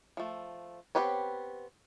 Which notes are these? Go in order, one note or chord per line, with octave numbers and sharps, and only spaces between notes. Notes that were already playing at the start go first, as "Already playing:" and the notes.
F3 A3
B3 C4 G4 B4 C#5